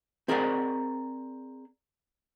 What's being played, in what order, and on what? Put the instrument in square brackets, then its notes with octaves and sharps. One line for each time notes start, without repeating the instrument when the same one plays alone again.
[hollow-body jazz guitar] C4 G#4 A#4 C5 D5 F#5